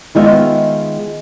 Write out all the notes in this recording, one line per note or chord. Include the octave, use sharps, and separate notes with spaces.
D#3 G#3 B3 F4 D#5 E5